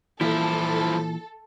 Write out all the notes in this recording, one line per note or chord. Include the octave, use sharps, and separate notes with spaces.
A#2 E3 F3 E4 A4